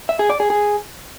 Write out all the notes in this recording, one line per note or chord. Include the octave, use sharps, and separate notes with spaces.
E5
G#4
D5
G#4
G#4